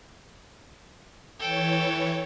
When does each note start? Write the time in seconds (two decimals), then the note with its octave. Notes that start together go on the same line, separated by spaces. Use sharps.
1.40 E3 A4 C#5 G5